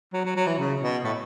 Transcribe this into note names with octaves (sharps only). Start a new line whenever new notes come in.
F#3
F#3
F#3
E3
C#3
B2
A2